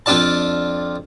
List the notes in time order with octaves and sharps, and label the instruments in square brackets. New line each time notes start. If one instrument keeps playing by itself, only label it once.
[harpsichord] F2 D4 F4 D5 A5